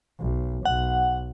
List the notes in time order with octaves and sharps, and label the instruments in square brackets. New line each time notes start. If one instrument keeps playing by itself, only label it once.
[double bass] B1
[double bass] B1 [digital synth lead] F#5